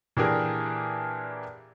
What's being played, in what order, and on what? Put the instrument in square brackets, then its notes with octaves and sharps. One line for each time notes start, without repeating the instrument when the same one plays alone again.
[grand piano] A#2 E3 D4 G4 G#4 A#4